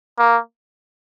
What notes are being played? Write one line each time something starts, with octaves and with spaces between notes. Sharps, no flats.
A#3